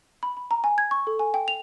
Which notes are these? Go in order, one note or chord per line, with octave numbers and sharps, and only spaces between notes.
B5
B5
A#5
G#5
G#6
C#6
A4
G#5
G5
F7